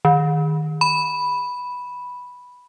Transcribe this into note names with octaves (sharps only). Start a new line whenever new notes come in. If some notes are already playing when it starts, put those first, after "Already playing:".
D#3
B5